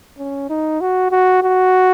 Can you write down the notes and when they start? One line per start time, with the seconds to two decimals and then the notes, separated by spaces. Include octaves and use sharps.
0.18 C#4
0.50 D#4
0.81 F#4
1.11 F#4
1.43 F#4